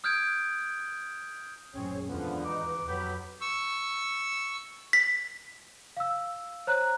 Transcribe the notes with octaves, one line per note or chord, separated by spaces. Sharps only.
D#6 F6 G6 G#6 D7
A1 F#2 A#2 C4 C#4 G#4 C#5
G#1 E2 D3 F3 B3 B4
D#4 D6
F2 F#3 B3 G4 B5
C#6 E6
B6
F5 E6
C5 C#5 A#5 F#6